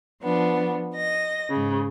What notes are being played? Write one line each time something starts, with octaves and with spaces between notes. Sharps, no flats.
F3 B3 D4
D#5 A#6
G#2 C#3